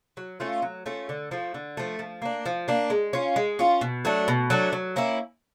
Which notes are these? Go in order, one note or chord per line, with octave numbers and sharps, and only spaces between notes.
F#3
A3 C#4 F4
F#3
A3 C#4 F4
D3
F3 A3
D3
F3 A3
F3
A#3 D4
F3
A#3 D4
G#3
C#4 F4
G#3
C#4 F4
B2
F#3 A3 D4
B2
F#3 A3 D4
F#3
A#3 C#4 E4